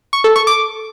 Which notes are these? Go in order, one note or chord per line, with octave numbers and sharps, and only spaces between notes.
C#6
A4
C#6
D6